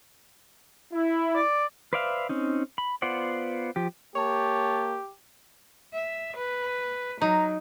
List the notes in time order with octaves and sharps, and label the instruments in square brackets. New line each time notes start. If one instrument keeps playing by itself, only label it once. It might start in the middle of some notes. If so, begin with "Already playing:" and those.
[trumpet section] E4
[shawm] D5
[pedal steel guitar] B4 C5 D5 E5 F5
C4 C#4 D#4
B5
B3 F4 C5 D5 F#5
F3 G4
[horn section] A#3 C#5 A5 [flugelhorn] G4
[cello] E5
B4
[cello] F#3 [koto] D#4 [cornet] A#5